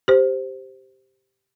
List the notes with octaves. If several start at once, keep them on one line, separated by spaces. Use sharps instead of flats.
G4 C5